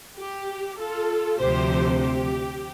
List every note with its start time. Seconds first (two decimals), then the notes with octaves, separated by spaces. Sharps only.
0.17 G4
0.78 F4 A4
1.39 D2 C3 F3 G4 C5
2.01 G4